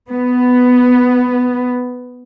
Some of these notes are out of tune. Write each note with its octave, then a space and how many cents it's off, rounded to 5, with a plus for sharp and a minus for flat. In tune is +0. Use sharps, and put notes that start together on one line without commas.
B3 +10